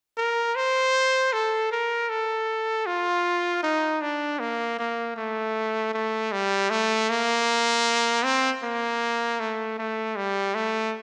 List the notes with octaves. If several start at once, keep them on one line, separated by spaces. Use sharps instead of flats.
A#4
C5
A4
A#4
A4
F4
D#4
D4
A#3
A#3
A3
A3
G3
A3
A#3
C4
A#3
A3
A3
G3
A3